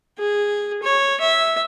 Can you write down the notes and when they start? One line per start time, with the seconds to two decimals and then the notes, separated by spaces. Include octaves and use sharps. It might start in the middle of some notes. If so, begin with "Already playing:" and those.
0.19 G#4
0.83 C#5
1.21 E5